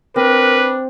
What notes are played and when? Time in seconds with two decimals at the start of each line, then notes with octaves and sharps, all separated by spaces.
0.16 C4 D4 A#4 B4